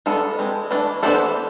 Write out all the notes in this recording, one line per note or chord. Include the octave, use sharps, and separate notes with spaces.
G#3 B3 D4 F4 A4
E3 G#3 C4
E3 A3 D4
E3 B3 D4 A4 C5